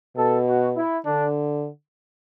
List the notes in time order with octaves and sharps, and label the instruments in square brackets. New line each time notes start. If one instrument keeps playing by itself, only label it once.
[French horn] B2 [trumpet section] A4
[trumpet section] F#4
E4
[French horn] D3 [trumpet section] D4